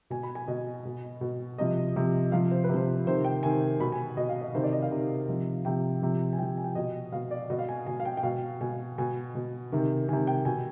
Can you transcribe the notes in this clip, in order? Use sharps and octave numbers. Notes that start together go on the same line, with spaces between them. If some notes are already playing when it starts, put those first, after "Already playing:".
B2 G#5
B5
G#5
B2 D#5
B2
B2
C3 F3 D#5
C3 F3
C3 F3 F5
C5
B4
C3
F3 C5
C3 D#3 C5
G5
C3 D#3 G#5
B2 B5
G#5
B2 D#5
F5
D#5
C3 D#3 C5
D5
D#5
F5
C3 D#3
C3 F3
C3 F3 G5
C3 F3
G#5
C3 F3 G5
G#5
G5
B2 D#5
B2 F5
D5
B2 D#5
F5
G#5
B2 G#5
F5
G5
G5
B2 F5
B2 G#5
B2 G#5
B2
C3 D#3
C3 D#3 G#5
G5
B2 G#5